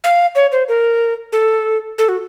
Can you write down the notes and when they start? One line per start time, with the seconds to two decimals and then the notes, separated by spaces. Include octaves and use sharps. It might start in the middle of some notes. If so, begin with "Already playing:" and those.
0.04 F5
0.35 C#5
0.52 C5
0.68 A#4
1.32 A4
1.98 A4
2.09 F#4